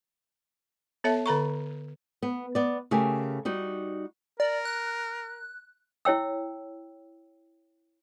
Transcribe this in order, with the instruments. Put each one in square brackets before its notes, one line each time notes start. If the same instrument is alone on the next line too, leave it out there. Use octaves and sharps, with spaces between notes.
[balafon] B3 A4 C#5 E5 A5
D3 A4 A#5 C#6
[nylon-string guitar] B3
B3 D5
C#3 A3 G4 A#4 G#5
G3 D#4 F#4
[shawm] A#4 [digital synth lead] D5
[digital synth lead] F#6
[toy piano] E4 C#5 G5 E6